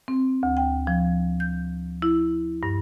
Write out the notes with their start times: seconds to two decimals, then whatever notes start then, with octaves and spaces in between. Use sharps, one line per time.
0.08 C4
0.43 D2
0.57 G5
0.87 F3
1.40 G6
2.02 E4
2.63 G2